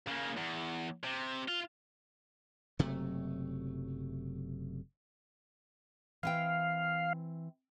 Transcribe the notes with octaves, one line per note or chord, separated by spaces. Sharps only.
C#3 A#3
E2
C3
F4
F#1 C3 F#3 A3
E3 C4 F5 G5